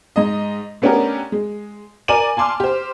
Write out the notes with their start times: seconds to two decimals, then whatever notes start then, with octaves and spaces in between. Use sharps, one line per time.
0.16 G#2 D#5
0.82 A3 B3 C#4 D4 G4 A#4
1.32 G#3
2.08 A#4 D5 G#5 D6 D#7 F#7
2.37 G#5 A5 C6 D6 F6
2.60 G4 C5